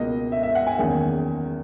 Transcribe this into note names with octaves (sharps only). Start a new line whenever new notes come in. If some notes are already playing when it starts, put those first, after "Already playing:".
Already playing: C#2 B2 A#3 D#5
E5
E5
F#5
G#5
F#1 E2 D#3 G#3 C#4